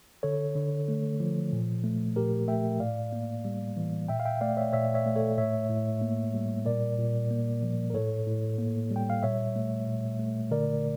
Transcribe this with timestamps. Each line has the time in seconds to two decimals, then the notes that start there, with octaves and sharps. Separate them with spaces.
0.23 D3 A4 C#5
0.56 D3
0.88 A3
1.20 F3
1.52 A#2
1.84 A3
2.16 A#2 G4 A#4
2.48 A3 E5 G5
2.80 A2 D5 F5
3.13 A#3
3.45 G3
3.77 E3
4.08 A#2 E5 G5
4.20 F5
4.25 E5 G5
4.41 A3 D5 F5
4.57 C#5 E5
4.73 A#2 C#5 E5
4.94 C#5 E5
5.06 A3
5.16 A4 C#5
5.38 A2 C#5 E5
5.70 A2
6.02 A#3
6.34 G3
6.66 A#2 A#4 D5
6.98 A#2
7.31 A#3
7.63 F3
7.90 A#4
7.94 A2 A4 C#5
8.27 A2
8.58 A#3
8.91 G3
8.96 G5
9.10 F5
9.23 A#2 C#5 E5
9.56 A3
9.87 A#2
10.19 A3
10.51 D3 A#4 D5